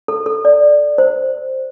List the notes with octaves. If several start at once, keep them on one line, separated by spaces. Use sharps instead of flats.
A4
A4
D5
C5